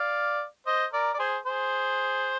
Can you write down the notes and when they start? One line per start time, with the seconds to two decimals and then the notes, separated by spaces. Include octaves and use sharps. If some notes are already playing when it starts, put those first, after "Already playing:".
Already playing: D5 F5
0.67 C5 D#5
0.93 A#4 D5
1.14 D5
1.19 G#4 C5
1.46 G#4 C5